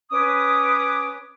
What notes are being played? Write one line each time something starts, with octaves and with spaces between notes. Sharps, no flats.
C#4 B4 D6 D#6